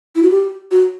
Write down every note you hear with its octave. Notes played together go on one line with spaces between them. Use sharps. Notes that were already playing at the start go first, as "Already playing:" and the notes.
E4
F#4
G4
F#4